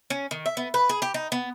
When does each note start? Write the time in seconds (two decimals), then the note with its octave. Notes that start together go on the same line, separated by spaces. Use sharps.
0.10 C#4
0.31 D#3
0.46 E5
0.57 B3
0.74 B4
0.89 G#4
1.02 G4
1.14 D#4
1.32 B3